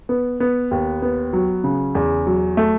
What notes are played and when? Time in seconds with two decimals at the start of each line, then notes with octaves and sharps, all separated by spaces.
0.09 B3
0.40 B3
0.71 D#2
1.02 B3
1.33 F#3
1.64 C#3
1.95 E2
2.27 F#3
2.57 A3